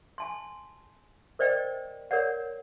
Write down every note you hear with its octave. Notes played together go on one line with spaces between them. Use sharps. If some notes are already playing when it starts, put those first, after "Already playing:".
G#5 A5 C6
A#4 C5 D5 D#5 G5
A#4 C#5 D5 F#5